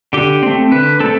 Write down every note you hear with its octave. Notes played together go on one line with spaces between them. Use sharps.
D3 G4
A3 C4
D3 B4
A3 C4 A4